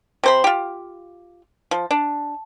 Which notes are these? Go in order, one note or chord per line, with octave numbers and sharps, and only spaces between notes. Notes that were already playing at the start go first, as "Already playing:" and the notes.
C3 C5 B5
F4 G4
F3
D4